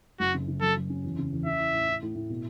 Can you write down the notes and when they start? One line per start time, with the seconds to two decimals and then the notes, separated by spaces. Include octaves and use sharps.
0.20 F#1 F#4
0.34 C#3
0.48 C#3
0.61 F#2 A4
0.76 F#3
0.90 C#4
1.04 E2
1.18 C#3
1.32 E2
1.46 C#4 E5
1.59 E3
1.74 A2
1.88 E4
2.02 A2
2.15 A2
2.30 B2